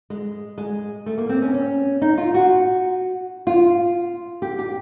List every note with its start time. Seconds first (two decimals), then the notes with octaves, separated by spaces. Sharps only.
0.10 G#3
0.58 G#3
1.06 A3
1.18 A#3
1.29 C4
1.42 C#4
1.54 C#4
2.02 D#4
2.18 F4
2.34 F#4
3.47 F4
4.42 G4
4.59 G4